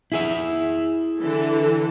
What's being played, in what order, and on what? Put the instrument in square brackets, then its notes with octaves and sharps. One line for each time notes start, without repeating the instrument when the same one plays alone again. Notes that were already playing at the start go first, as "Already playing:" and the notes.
[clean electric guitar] E4 G#4 E5
[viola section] D3 E3 A4